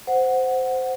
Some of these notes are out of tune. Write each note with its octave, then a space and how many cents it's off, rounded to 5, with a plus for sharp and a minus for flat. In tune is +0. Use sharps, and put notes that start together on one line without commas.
C5 -10 F#5 +0